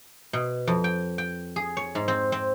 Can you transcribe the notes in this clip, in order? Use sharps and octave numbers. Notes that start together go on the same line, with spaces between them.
B2
F2
G5
G5
G#4
C#5
G#2
C4
C4